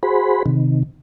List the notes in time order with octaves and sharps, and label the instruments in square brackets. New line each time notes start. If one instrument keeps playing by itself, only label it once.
[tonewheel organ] F#4 G#4 C5 B5
C3 D#3